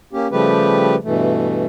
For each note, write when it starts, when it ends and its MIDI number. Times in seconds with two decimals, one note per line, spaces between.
0.13 0.27 58
0.13 0.27 61
0.13 0.27 67
0.31 0.95 49
0.31 0.95 53
0.31 0.95 55
0.31 0.95 57
0.31 0.95 67
0.31 0.95 71
1.04 1.66 43
1.04 1.66 47
1.04 1.66 52
1.04 1.66 57